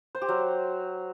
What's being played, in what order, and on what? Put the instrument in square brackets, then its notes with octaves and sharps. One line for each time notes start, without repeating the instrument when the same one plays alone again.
[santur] C5
G4
F#3